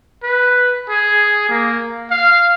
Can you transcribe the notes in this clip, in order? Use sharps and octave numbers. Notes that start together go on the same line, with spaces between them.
B4
G#4
A#3
F5